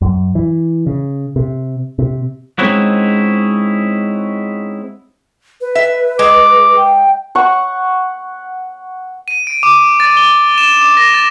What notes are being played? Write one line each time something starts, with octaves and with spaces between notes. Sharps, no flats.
F#2
E3
C#3
C3
C3
G#3 C4 C#4 D#4 E4 F#4
B4
E5
G#3 G#4 D6
G5
F#5 C#6
D#7
D7
D6
A6
G7
E7
D6
A#6
A6